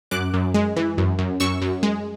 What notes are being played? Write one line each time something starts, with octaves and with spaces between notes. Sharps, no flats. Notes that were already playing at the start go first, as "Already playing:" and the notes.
F#2 D6 F#6
F#2
G#3
E3
F#2
F#2
F#2 C#6 E6
F#2
G#3